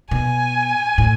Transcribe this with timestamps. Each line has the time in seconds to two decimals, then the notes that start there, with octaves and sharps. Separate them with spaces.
0.11 B2 G#5
0.98 A2